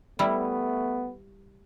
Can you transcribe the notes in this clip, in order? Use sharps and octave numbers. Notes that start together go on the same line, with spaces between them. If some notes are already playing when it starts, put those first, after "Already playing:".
G3 A3 B3 E4